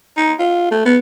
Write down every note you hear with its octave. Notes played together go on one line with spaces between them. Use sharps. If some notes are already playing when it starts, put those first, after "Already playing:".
D#4
F4
A3
B3